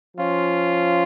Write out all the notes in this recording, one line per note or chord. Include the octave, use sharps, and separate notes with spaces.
F3 C#4 F4